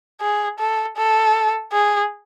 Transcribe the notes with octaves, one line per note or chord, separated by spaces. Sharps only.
G#4
A4
A4
G#4